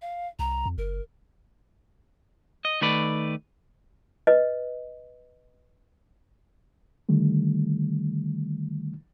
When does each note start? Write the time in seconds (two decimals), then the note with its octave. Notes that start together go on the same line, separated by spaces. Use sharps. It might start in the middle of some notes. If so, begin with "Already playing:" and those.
0.02 F5
0.39 C2 A#5
0.66 F2
0.78 F#1 A#4
2.65 D#5
2.81 D#3 A3 B4 D5
4.27 B4 D#5
7.09 D3 D#3 G3 A3